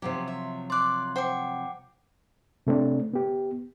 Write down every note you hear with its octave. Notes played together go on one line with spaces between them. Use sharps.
C3 F3 F#3 G4
E5
D5 C6 D6 F#6
C5 F#5 G5 D6
C3 A3 C4 D4
B3 G4